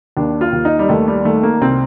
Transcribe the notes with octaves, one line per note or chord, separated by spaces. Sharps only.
D#2 D4
F4
D#2
D#4
G3
D#2 A3
G3
D#3 A3
A#3
C2 C4